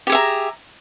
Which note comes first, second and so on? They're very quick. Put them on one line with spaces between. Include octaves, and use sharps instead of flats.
G4 G#4 E5 A#5